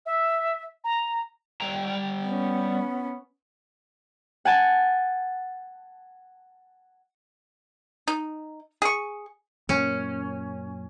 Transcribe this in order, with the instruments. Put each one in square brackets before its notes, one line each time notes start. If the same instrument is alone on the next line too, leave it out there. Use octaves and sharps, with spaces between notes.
[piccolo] E5
A#5
[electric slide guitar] G3 G5 A#5
[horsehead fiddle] B3 C#4
[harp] F#5 G#5 A5
[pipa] D#4
G#4 C#6
[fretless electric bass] F#2 A#2 A#3 [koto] C#4